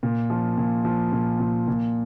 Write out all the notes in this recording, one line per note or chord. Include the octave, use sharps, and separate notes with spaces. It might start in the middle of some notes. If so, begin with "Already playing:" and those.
A#2
F3
A#2
F3
A#2
A#2
A#2